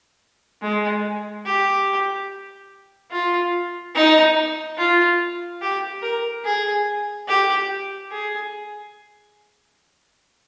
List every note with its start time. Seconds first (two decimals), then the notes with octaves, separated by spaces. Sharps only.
0.62 G#3
1.46 G4
3.11 F4
3.95 D#4
4.78 F4
5.61 G4
6.02 A#4
6.44 G#4
7.28 G4
8.11 G#4